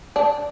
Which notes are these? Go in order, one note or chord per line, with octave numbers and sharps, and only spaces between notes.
D4